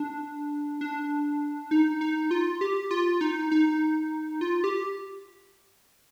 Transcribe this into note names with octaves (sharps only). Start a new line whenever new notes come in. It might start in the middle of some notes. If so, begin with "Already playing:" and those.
Already playing: D4
D4
D#4
D#4
F4
G4
F4
D#4
D#4
F4
G4